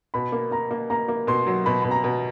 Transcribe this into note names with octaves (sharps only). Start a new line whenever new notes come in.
B2 B5
A#3
A#3 A#5
A#3
A#3 A#5
A#3
B2 C6
F#3
B2 B5
B2 B5
A#5
B2